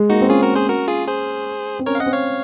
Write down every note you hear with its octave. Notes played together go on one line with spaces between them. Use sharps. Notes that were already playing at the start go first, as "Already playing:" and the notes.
Already playing: G#3
A#3 D#4 F#4
C4
C#4 F4 G#4
F#4 A#4
G#4 C5
F#4 A#4
F4 G#4
G#4 C5
C4
C#4 A#4 C#5
F5
D#5 F#5
C4
C#5 F5